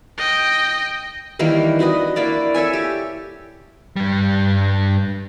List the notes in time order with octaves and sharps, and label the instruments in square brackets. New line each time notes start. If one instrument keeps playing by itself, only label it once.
[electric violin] D#5 G5
[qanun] D#3 E3 G3 A#3
D4 F#4 B4 D#5
A#3 E4 D5
A4 C#5 E5 G#5
G4
[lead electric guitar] G2 G3